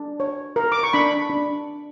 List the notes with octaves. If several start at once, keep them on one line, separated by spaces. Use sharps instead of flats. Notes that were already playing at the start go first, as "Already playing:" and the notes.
Already playing: D4
C#5
A#4
D6
C#6
D4 B5
D4